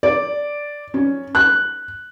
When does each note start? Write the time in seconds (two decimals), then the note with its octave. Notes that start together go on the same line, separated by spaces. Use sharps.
0.03 D5
0.94 C#4
1.35 F#6